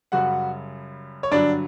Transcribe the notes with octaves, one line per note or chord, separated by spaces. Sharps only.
F#2 C#3 G3 F#4 F#5
C#5
G2 D3 F#3 D4 D5